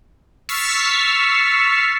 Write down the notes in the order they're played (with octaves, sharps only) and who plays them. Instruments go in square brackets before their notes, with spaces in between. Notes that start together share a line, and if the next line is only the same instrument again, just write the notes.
[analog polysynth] C#6 E6 F6 A6 B6 C7